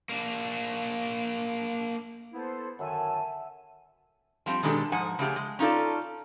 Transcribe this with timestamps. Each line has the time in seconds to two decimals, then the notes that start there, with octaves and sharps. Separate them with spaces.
0.09 A#3 D4
2.33 B3 E4 A4 C5
2.79 F#2 D3 D#3 A4 E5 F#5 G#5 A5
4.46 F3 G3 C4
4.63 B2 D#3 G#3 D4 G4 A4
4.92 G#2 F3 F#5 G#5
5.19 C#3 A3 G4 G#4
5.36 G#3
5.59 C#4 D#4 F4 A4 D5